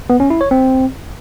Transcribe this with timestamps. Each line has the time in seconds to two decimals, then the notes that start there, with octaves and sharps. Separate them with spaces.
0.10 B3
0.20 C#4
0.30 E4
0.41 C#5
0.51 C4